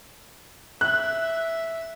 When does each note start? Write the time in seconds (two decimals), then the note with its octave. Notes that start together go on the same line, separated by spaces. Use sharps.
0.81 E5 F#6